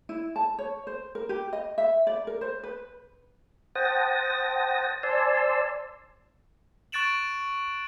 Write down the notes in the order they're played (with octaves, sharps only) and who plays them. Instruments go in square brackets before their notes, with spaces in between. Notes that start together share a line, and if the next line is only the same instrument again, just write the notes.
[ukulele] E4
A5
C#5
C5
A#4
G4
D#5
E5
D5
A#4
C5
B4
[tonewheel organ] C5 F#5 G5 A5 D#6 A#6
C5 D5 G#5 A5 C6 E6
[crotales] C#6 F#6 A6 D7 E7 F#7